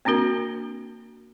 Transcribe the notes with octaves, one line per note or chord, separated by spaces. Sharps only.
A#3 C4 D4 F#4 A#4